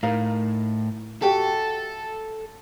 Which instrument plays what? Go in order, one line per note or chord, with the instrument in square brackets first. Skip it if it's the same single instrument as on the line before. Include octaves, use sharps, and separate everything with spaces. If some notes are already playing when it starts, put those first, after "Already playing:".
[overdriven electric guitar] A2 [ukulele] D#4 A#4 F5
[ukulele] F#4 G4 E5 [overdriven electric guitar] A4